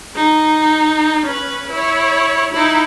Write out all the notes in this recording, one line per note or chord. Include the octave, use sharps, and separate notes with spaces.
D#4
C#4 B4
E4 C#5
D#4 E4